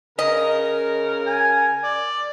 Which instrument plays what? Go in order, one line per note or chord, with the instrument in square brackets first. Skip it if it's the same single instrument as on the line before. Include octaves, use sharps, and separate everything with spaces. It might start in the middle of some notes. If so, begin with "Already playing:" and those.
[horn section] C#3 A#4 [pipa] D#5
[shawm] G#5
D5